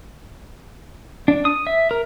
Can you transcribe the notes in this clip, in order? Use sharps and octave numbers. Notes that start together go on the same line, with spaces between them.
D4
D#6
E5
A#4